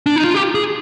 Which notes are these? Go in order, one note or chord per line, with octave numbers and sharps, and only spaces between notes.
D4
D#4
F4
G4
G#4